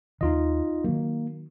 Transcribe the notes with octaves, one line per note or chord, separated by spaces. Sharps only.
D#2 D#3 D#4 F4 D#5
D#3 F#3 A#3